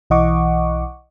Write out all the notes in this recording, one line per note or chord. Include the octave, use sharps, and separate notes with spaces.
B1 E3 D#5 F#5 C#6 D6